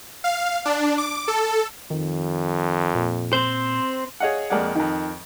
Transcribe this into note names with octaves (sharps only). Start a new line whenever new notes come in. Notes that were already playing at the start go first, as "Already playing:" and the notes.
F5
D4
D6
A4
F2 D#3
A#2
C4 C5
G#4 C#5 D#5 F5 F#5
F2 G#3 A#3 D5 F#5
F2 D#3